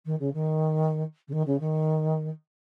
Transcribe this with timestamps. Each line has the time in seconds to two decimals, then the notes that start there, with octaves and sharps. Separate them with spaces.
0.05 D#3
0.19 C#3
0.33 D#3
1.27 C#3
1.32 D#3
1.46 C#3
1.60 D#3